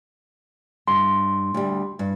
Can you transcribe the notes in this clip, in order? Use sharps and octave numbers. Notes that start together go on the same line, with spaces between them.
G2 C6
D2 G3
G2